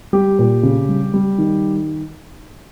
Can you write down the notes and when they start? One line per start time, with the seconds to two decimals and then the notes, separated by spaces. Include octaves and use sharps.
0.13 G3 G4
0.39 A#2
0.63 C#3
0.89 G3
1.14 G3
1.38 D#3